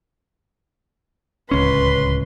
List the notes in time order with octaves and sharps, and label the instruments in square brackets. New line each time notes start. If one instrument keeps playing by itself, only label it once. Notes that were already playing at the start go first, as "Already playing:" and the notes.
[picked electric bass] D1 C#2 C#4 [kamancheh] B4 C6